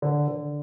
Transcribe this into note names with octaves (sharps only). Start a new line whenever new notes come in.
D3
D3